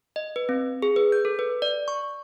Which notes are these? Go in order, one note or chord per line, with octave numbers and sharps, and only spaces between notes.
D#5
B4
C4
G#4
B4
G6
A4
B4
D5
C#6